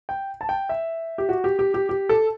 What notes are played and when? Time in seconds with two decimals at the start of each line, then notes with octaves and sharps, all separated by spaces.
0.09 G5
0.41 A5
0.49 G5
0.69 E5
1.18 G4
1.29 F#4
1.44 G4
1.59 G4
1.74 G4
1.89 G4
2.09 A4